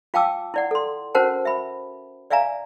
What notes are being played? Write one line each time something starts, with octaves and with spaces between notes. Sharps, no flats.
F4 F5 G5 A5 D6 E6
E4 D5 F#5
A4 C6
C#4 F#4 A#4 C5 F#5 A5
E5 B5
D5 E5 F5 G#5 A#5